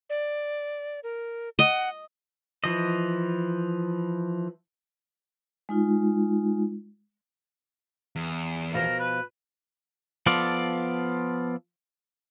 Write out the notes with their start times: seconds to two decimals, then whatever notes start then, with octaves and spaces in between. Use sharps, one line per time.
0.10 D5
1.04 A#4
1.59 D#5 F#5
2.64 E3 F3 D#5
5.69 G#3 D#4 F4
8.16 E2
8.73 B2 F3 A#4
8.99 B4
10.26 F3 B3 F4 A4 D5